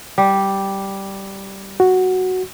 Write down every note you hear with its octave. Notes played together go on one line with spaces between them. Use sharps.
G3
F#4